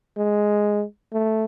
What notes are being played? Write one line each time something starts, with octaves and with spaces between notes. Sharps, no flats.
G#3
A3